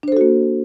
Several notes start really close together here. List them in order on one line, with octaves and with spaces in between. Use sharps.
D4 C5 A4 F#4 A#3